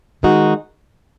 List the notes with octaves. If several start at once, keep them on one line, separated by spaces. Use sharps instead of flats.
D#3 G#3 D#4 F#4